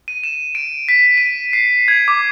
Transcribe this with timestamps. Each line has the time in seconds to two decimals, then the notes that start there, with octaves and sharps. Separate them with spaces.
0.08 D#7
0.24 E7
0.55 D7
0.88 B6
1.17 D#7
1.53 C7
1.88 G#6
2.08 D6